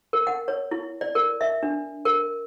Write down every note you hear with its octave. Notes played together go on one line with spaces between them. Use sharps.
A#4
F#5
C#5
E4
D5
A#4
E5
D4
A#4